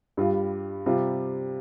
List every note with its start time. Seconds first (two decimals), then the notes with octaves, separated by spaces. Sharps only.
0.17 G2 G3 F4
0.86 C3 G3 F4